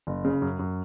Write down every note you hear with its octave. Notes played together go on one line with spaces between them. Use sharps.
F#1
C#3
F#2
F#2